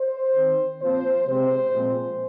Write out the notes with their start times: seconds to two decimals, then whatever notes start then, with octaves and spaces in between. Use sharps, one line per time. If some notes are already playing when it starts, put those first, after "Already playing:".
Already playing: C5
0.34 D#3 C4
0.81 A#2 F3 C4 C5
1.26 C3 G#3 C4 C5
1.72 A#2 F3 G#3 C4